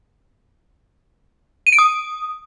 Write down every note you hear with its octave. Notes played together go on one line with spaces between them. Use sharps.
D#7
D7
D#6